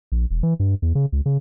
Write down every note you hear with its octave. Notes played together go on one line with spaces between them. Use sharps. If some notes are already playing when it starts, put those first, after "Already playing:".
A#1
E1
E3
G2
E2
C#3
C#2
C#3